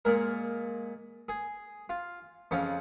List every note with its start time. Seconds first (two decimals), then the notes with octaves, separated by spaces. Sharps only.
0.05 A#2 G#3 A#4
1.29 G#4
1.89 F4
2.51 F2 C#3 F3 C#4